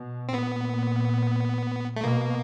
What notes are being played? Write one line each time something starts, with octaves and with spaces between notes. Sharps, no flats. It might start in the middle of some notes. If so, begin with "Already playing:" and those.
Already playing: B2
C4
A#2 B3
A3
B2 A#3